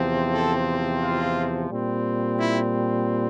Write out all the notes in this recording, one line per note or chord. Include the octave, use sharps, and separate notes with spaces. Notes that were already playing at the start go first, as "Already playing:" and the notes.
Already playing: E2 C3 F3 C4
A4
F4
A#2 G3 C4
E4